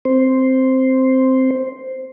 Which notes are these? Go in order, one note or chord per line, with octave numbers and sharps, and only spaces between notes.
C4 C5